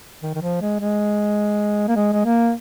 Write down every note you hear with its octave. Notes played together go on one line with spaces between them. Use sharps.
D#3
D#3
F3
G#3
G#3
A#3
G#3
G#3
A#3